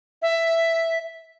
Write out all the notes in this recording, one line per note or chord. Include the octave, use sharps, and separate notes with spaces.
E5